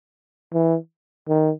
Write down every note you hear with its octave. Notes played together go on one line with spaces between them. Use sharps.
E3
D#3